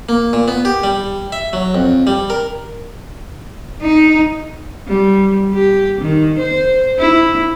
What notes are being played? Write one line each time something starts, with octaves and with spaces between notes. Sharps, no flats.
A#3
A#2
B3
G4
G3
E5
F#3
F2
G3
A#4
D#4
G3
G4
D#3
C5
E4